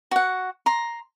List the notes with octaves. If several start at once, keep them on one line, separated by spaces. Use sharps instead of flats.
F#4 F#5
A#5 C6